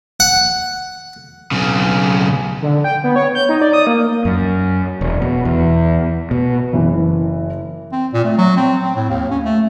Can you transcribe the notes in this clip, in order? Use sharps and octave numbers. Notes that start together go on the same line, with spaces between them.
F#5
B1 C#3
D3
G5
B3
C#5
G6
D#4
D5
D#6
A#3
F#2
E1
B2
E2
B2
F#1 E3
C4
A#2
A3
F#3
C4
C4
A2
D#2
C#4
A3